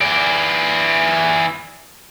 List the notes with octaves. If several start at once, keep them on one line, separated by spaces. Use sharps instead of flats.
E3 D5